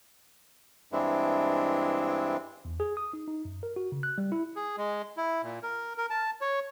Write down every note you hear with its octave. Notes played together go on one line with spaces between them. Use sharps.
G2 E3 G#3 C4 D4 E4
E2
G#4
D#6
D#4
D#4
F#2
A#4
F#4
C#3
F#6
G3
E4
G#4
G#3
E4
A#2
A#4
A#4
A5
C#5